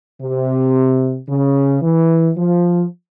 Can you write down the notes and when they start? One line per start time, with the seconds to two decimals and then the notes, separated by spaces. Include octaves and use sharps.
0.22 C3
1.29 C#3
1.82 E3
2.37 F3